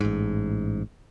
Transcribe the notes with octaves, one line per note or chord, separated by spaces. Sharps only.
A1 G#2